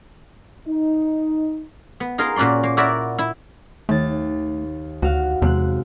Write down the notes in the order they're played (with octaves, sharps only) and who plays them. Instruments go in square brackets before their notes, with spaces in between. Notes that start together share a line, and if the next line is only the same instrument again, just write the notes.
[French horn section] D#4
[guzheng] B3
D#4 F4 G#4 A#4
A#2 C#4 F#4 D5 C6
A#3
E4 F#4 A#4 D5 E5
E4
[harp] D#2 A6 [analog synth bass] A3
[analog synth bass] D2 [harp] F#4 F5
[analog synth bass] E2 [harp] C3 G#3 F#6